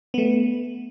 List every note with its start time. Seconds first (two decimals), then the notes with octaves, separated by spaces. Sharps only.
0.14 A3 B3